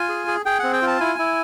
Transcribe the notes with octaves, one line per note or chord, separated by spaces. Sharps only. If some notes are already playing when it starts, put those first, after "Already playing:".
Already playing: F4 G#5
G#4
G#4
G#4 G5
C4 F#5
G5
F4
A5
E4 G#5
E4